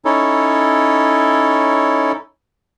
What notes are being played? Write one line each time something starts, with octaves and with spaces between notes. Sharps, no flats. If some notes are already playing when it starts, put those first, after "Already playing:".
C#4 D#4 E4 A4 C#5